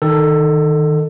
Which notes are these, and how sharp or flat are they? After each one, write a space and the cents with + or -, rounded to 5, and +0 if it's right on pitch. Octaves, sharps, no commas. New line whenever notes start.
D#3 +0 A4 +15